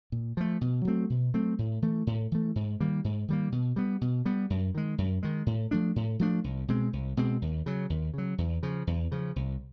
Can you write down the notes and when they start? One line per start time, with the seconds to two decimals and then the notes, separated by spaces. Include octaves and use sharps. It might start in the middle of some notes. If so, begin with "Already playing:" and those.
0.12 A#2
0.37 F3 A3
0.61 B2
0.85 F#3 A3 C4
1.10 B2
1.34 F#3 A3 C4
1.59 A2
1.82 E3 A3
2.07 A2
2.32 E3 A3
2.56 G#2
2.80 D#3 G3 A#3
3.04 G#2
3.28 D#3 G3 A#3
3.52 B2
3.76 G3 B3
4.01 B2
4.26 G3 B3
4.50 F#2
4.75 D#3 G#3
4.98 F#2
5.23 D#3 G#3
5.46 A2
5.71 F3 A3 D4
5.96 A2
6.19 F3 A3 D4
6.44 C2
6.68 B2 G#3 C4
6.93 C2
7.17 B2 G#3 C4
7.42 D#2
7.66 C#3 F#3
7.90 D#2
8.14 C#3 F#3
8.38 E2
8.63 C#3 F3
8.87 E2
9.12 C#3 F3
9.36 C2